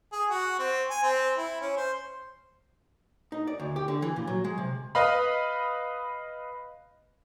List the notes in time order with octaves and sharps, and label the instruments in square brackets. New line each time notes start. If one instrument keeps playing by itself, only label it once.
[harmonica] G#4
F#4
C4
G#5
C4
E4
C#4
C5
[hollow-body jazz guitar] D#4
D5
D2
G4
D3
E3
A#2
F#3
G#3
C3
[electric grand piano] B4 D#5 F5 B5